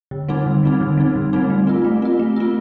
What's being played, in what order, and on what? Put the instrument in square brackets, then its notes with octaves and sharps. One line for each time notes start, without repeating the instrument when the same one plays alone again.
[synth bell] D3
G3 C4 D#4
D3
G3 C4 D#4
D3
G3 C4 D#4
D3
G3 C4 D#4
A3
C4 F4
A3
C4 F4
A3
C4 F4